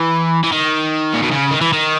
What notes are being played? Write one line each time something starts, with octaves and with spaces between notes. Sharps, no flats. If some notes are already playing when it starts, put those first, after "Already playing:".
Already playing: E3
E3
D#3
A#2
B2
C#3
D#3
E3
D#3